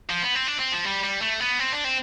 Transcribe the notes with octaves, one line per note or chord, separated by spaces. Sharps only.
F3
B3
C4
D4
C4
F3
G3
G3
A3
B3
C4
D4
C4